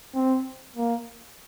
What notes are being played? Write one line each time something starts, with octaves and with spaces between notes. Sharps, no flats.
C4
A#3